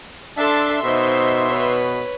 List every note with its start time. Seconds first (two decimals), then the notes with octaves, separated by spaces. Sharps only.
0.37 D4 A4 E5 A5 C6
0.83 B2 D#4 C5
1.50 B4 C#5